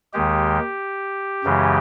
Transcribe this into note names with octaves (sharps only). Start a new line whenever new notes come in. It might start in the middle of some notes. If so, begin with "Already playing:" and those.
D#2 D#3 G#3 G4
F#2 C#3 E3 G#3